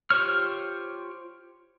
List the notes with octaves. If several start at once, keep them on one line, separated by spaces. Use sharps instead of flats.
F4 G4 C5 C#5 F6